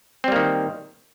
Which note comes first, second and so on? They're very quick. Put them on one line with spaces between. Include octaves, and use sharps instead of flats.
C4 G3 A#3 D#3